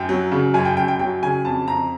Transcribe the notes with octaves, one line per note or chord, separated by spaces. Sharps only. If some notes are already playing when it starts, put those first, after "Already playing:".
Already playing: F#2 G5
F#3
C#3
F#2 G#5
G5
F#2 G5
G5
F#3 G5
C#3 G#5
F2 A5
F2 A#5